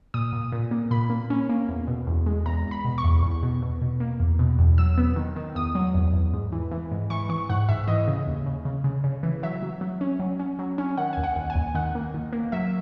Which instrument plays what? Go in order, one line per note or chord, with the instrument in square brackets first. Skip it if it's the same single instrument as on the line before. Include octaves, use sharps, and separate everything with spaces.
[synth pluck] A#2 D#6
A#2
A#2
A#3
A#2 B5
A#3
C#4
A#3
E2
B2
E2
G#3
E2 A#5
E2
B5
B2
C#6
E2
E2
B2
B2
B2
A#3
E2
B2
E2
F#3 E6
B3
D#3
D#3
E2 D#6
F#3
E2
E2
G#2
E3
E3
G#2
E3 C#6
E3 C#6
G#2 F#5
G#2 E5
E3 D#5
C#3
D#2
C#3
C#3
C#3
C#3
E3
F#3 E5
F#3
F#3
C#4
F#3
C#4
F#3
C#4
D#3 F#5
D#2 G#5
F#5
D#2
G#5
D#2
D#3 F#5
A#3
D#3
A#3
F#3 E5